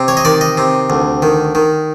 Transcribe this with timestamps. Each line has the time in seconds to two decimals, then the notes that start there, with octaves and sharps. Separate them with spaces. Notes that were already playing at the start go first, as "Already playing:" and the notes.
Already playing: C3
0.08 C#5
0.17 D#5
0.25 D#3 D5
0.41 D#5
0.57 C3
0.90 D2
1.22 D#3
1.55 D#3